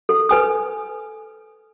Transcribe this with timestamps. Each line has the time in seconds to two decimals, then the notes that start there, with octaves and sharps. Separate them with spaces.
0.09 A4
0.29 A4 B4 G#5 D#6